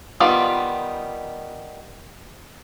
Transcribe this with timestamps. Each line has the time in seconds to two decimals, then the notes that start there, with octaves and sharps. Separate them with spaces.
0.20 D#3 G3 B3 F4 D5